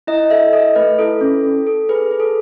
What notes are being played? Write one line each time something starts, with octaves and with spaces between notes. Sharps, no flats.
E4 D#5
A4 E5
A4 D#5
A3 B4
E4 A4
C#4
A4
A4
G#4 B4
G#4
A4